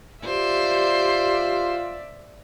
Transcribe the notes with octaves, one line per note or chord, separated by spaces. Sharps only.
F4 G4 C5 D5 E5